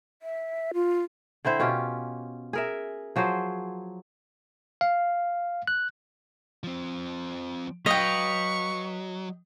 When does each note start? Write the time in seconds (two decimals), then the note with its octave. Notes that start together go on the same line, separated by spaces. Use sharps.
0.22 E5
0.74 F4
1.45 D3 C4 E4 C5
1.60 B2 C#4 F4 G4
2.53 G#4 A#4 E5
3.16 F3 F#3 G#4 C5
4.81 F5
5.67 F#6
6.64 F3 C4
7.86 F#3 B4 D#5 F5 G5 C#6